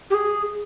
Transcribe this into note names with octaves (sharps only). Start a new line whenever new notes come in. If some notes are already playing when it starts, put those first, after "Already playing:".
G4
G#4